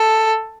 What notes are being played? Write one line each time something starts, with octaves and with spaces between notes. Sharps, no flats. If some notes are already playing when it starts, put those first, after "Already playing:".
Already playing: A4